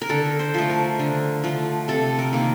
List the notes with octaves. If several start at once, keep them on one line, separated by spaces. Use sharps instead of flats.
A#4
D3 A4
C5
F3 A3
A#4
D3
F3 A3
C3 A4
A#4
D#3 A#3